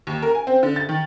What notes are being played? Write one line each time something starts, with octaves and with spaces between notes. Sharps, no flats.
D#2
A#4
G#5
C4
D3
A6
D#3